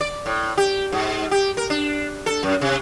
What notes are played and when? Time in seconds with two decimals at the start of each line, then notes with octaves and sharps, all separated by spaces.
0.01 D5
0.26 A2
0.58 G4
0.92 G#2
1.31 G4
1.57 A#4
1.70 D4
2.26 A4
2.43 F#2
2.61 C3